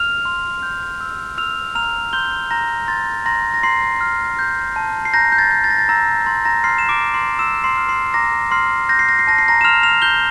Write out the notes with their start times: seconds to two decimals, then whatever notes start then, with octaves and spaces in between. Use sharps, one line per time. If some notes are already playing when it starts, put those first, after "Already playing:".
Already playing: F6 F7
0.25 C6
0.63 G6
1.01 E6
1.38 E6 F6 F7
1.75 A#5 F6 F7
2.13 C6 G6 G7
2.51 A#5 G6 A#6
2.88 C6 A6
3.26 A#5 C6 A#6
3.54 A#6
3.63 A#5 C6 C7
4.01 F6
4.39 G6
4.76 A5
5.05 C7
5.13 A#5 G6 A#6
5.32 G6
5.38 A6
5.51 G6
5.64 A6
5.71 A#6
5.78 A6
5.89 A#5 E6 A#6
6.26 C6 A6
6.45 A#5 A#6
6.64 C6 F6 C7
6.78 E7
6.89 D6 D7
7.01 F6
7.14 C6 C7
7.39 C6 E6 E7
7.64 C6 C7
7.77 F6
7.89 C6 C7
8.14 A#5 D6 A#6
8.51 C6 F6 C7
8.89 G6 A#6
8.99 C7
9.09 A#6
9.19 C7
9.27 A5 A#6
9.38 C7
9.48 A#5 A#6
9.61 E7
9.64 C6 F6 F7
9.83 F6 F7
10.02 G6 G7